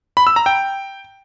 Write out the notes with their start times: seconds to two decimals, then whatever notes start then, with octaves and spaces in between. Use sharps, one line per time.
0.17 B5
0.27 E6
0.36 A#5
0.46 G5